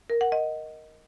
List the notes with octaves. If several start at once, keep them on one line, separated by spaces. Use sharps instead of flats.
A#4
F#5
D#5